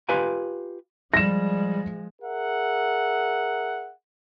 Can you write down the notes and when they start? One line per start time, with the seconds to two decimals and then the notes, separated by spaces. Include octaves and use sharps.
0.09 F4 G4 B4 F5 G#5 A#5
1.14 F3 G3 G#3 A#6 E7
2.22 G#4 A#4 E5 F#5